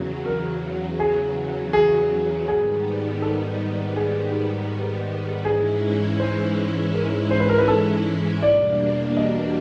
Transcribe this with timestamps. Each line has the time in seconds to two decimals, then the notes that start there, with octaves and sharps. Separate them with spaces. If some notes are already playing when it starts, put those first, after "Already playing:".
Already playing: E2 C#3 F#3
0.26 A#4
1.00 G#4
1.73 G#4
2.48 G#2 D#3 G3 B3 G#4
3.22 A4
3.96 G#4
5.45 G#2 E3 G#3 C#4 E4 G#4
6.20 C5
6.94 A#4
7.31 C5
7.40 B4
7.49 A#4
7.58 B4
7.68 A4
8.42 E2 B2 G3 A#3 D4 D5
9.17 D#5